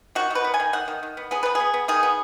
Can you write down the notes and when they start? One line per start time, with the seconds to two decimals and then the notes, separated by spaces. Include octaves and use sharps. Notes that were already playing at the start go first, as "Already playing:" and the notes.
0.15 D#3 F#4
0.30 D#3 B4
0.44 B3
0.54 G#5
0.60 D#3
0.73 D#3 F#5
0.88 D#3
1.03 D#3
1.17 B3
1.31 B3 G#4
1.43 B3 B4
1.55 G#4
1.60 B3
1.74 B3
1.88 D#3 G#4
2.03 B3